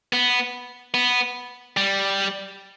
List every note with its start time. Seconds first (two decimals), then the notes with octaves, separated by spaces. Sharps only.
0.13 B3
0.94 B3
1.77 G3